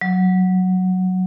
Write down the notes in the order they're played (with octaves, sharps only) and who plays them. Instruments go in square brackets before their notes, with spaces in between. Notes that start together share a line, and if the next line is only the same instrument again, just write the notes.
[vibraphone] F#3